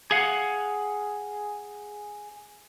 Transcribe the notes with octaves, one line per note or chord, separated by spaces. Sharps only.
G#4 F5 F#5